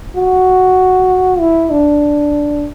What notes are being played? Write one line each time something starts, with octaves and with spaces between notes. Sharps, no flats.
F#4
E4
D4